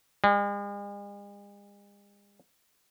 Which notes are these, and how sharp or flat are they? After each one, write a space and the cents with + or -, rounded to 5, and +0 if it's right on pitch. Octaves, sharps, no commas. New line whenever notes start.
G#3 -45